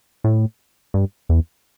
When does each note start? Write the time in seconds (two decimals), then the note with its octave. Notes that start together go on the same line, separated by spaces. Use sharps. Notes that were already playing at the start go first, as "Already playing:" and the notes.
0.24 A2
0.94 G2
1.29 E2